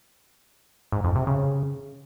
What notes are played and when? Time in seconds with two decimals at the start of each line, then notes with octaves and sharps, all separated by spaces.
0.92 G#2
1.04 F2
1.15 C3
1.27 C#3